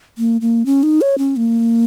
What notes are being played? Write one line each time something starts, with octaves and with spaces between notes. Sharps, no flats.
A#3
A#3
C#4
D#4
C#5
C#4
A#3